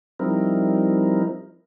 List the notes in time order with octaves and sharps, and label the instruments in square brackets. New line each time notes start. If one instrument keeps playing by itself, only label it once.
[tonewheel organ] F3 G3 C4 D#4 E4 A#4